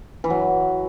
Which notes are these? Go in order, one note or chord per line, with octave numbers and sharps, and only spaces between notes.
E3
F#3